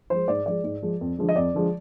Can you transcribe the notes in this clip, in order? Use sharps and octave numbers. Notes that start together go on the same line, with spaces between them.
F3 G#3 C5
G#2 D5
F3 G#3 D5
G#2
F3 G#3
F2
D3 F3 G#3
D#5
F2 D5
D3 F3 G#3